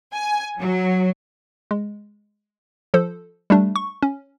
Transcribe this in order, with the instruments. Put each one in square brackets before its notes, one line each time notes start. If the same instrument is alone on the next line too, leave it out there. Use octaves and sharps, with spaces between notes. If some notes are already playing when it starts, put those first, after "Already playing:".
[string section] G#5
F#3
[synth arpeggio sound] G#3
F3 A4 C5
G3 A3 D4
C#6
C#4